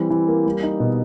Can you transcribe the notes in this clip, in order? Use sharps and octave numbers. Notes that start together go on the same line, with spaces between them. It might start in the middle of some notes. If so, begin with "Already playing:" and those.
Already playing: E3 G3 C4
E3
A#3
G3
D#4
B2